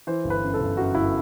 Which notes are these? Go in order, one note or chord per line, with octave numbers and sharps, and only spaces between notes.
E3 C5
G1
B4
F#2
A4
G1
F#2 F#4
G1 E4